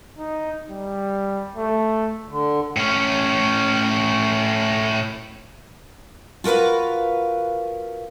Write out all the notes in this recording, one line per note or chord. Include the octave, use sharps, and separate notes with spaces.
D#4
G3
A3
D3
A2 C#4
F4 F#4 A#4 B4 F5